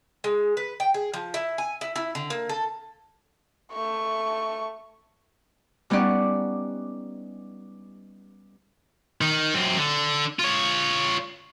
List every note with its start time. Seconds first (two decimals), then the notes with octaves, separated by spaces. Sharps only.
0.24 G#3
0.57 B4
0.80 G5
0.94 G#4
1.14 F3
1.34 E4
1.58 G#5
1.81 E4
1.96 E4
2.15 D3
2.30 A#3
2.49 A4
3.72 A3 C#6
5.90 G3 B3 C#4 D#4 D5 F#5
9.21 D#3
9.54 F#2 C4
9.77 D3
10.39 F4 C#5